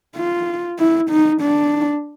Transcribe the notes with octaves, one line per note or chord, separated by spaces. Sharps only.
F4
E4
D#4
D4